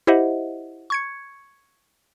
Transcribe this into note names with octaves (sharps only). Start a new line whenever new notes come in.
E4 G4 C5 D#5 E5 F#5
C#6 G#6 C#7